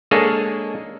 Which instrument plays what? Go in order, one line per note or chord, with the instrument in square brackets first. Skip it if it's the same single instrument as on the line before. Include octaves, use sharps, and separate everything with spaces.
[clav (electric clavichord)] G#3 A#3 D4 G#4 A4 C#5